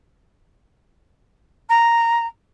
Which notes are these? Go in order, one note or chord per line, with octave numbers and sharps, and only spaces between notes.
A#5